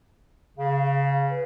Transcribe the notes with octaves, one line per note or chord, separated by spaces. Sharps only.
C#3 F5
B4